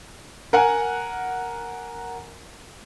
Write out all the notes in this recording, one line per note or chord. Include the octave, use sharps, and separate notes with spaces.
A#4 F#5 G#5